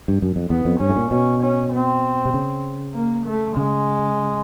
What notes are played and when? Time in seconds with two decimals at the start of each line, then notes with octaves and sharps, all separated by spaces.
0.08 G2
0.22 F#2
0.36 F2
0.50 E2 B3
0.65 F2
0.80 G2 C#4
0.90 A2
0.96 A#2
1.11 B2 C#4
1.42 C#4
1.72 C4
2.26 C3
2.34 C#3
2.95 A#3
3.26 A3
3.56 C#3 G#3